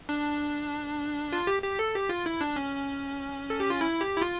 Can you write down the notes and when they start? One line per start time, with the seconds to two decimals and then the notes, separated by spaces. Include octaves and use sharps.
0.09 D4
1.33 F4
1.47 G4
1.63 G4
1.79 A4
1.94 G4
2.09 F4
2.26 E4
2.41 D4
2.56 C#4
3.50 A4
3.60 G4
3.70 F4
3.81 E4
4.01 G4
4.16 E4
4.22 F4